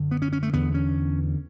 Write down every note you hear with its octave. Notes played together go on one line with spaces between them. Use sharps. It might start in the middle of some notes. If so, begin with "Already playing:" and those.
Already playing: F#2 D3
B3
C#4
C#4
A3
E2 D3 B3
C#4